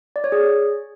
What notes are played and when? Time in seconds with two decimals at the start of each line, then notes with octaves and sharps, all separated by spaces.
0.16 D5
0.24 C#5
0.32 G#4